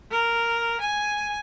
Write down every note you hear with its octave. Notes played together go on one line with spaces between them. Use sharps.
A#4
G#5